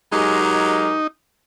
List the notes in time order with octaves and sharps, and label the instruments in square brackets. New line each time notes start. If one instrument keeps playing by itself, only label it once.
[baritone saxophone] F#3 [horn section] G#3 G4 A#4 [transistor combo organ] D#4